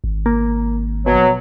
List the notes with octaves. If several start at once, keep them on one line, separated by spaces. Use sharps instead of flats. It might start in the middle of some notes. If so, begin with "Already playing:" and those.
G#1
A#3
B2 F#3